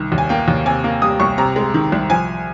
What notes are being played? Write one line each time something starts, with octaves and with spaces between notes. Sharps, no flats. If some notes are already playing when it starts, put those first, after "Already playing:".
Already playing: C2 D#3
D#2
G#5
A#3 G5
D#2
C3 G#5
A#3
G3 D#6
C2 C#6
C3 A#5
G#3
D#3
C2
F3 G#5